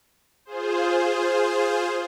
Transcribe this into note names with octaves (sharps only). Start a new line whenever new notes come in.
F4 G#4 C5